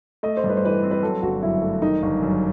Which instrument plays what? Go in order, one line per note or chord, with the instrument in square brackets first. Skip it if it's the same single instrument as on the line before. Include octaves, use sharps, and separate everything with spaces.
[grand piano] A3 [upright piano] D#5
[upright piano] C5
[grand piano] G2
[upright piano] B4
C5
[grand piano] E3 [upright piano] B4
[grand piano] C4
[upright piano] B4
[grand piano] F#3 [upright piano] A4
[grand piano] G1 [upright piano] F#4
[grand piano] F#2 [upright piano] E4
[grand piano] A3
[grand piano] D#3 [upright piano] D#4
[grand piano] G1
F#2